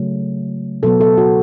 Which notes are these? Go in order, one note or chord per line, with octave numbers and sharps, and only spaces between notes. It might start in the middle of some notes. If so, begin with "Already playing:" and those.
Already playing: C#3 F#3 A3
B2 F#3 B3 A4
A4
F#4